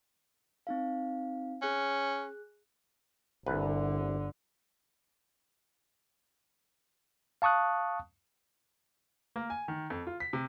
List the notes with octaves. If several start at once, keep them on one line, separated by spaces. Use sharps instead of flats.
C4 D#4 F5
C#4 G#4 F#6
G1 C2 D3 B4
F5 A5 C#6 D#6 F#6
A#3
G#5
D#3
F2
F4
B6
C3